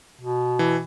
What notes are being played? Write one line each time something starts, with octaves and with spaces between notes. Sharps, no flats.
B2
E3